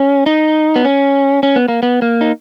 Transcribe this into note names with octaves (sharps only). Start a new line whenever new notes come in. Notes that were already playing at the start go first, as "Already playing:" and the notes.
Already playing: C#4
D#4
B3
C#4
C#4
B3
A#3
B3
A#3
D#4